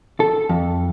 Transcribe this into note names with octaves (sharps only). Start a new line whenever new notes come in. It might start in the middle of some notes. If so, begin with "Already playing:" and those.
A4
F2